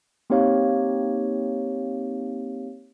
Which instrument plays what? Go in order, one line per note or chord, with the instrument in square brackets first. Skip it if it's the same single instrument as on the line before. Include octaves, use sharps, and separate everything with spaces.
[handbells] A#3 C4 D#4 G4 C#5 F5